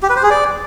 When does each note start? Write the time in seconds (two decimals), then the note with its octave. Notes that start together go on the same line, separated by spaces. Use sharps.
0.03 G4
0.10 B4
0.16 C5
0.23 G#4
0.30 D5